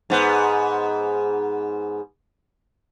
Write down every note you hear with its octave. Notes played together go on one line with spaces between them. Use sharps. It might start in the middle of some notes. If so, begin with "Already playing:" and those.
G#2 B3